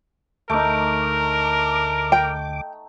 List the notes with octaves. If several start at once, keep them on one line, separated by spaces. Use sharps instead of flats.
D2 A3 D#4 A#4 D6
G5